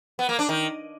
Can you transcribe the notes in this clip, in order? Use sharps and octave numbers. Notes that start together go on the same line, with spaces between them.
B3
A#3
D4
D#3